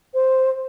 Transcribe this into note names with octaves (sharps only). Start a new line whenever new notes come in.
C5